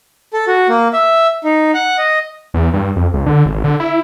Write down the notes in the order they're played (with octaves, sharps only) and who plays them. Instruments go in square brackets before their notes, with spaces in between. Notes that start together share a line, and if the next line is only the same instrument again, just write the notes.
[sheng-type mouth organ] A4
F#4
A#3
E5
D#4
F#5
D#5
[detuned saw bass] E2
G2
F2
C#2
D3
G#1
D3
E4